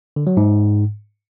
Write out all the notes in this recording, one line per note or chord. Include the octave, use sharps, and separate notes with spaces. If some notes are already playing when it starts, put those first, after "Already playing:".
D3
F#3
G#2